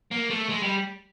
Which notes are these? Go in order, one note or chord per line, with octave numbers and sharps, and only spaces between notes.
A#3
A3
G#3
G3